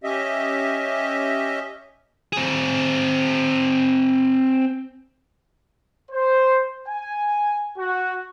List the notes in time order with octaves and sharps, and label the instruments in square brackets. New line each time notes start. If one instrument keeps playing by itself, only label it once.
[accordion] C#4 G4 D#5 E5
[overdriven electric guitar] C4 G#4
[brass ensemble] C5
G#5
F#4